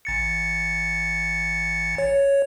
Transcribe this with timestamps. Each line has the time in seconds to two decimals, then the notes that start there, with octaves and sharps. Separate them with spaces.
0.05 A1 A6 C#7
1.98 C#5